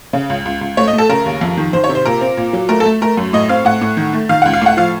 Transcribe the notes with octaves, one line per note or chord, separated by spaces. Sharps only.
C#3
C#2
C#2
C#2
A3 C#5
D#5
A3
A4
C#3 A#4
D#2
F2
D#3
D#3 C5
C#5
C3
C5
A#2 A#4
C4
A#2
F#3
A3 A#4
A4
A3
A3 A#4
F#2
A2 D#5
C4 F5
A2 F#5
A2
D#3
A3
D#3 F5
C#2 F#5
F5
A2 F#5
F3 F5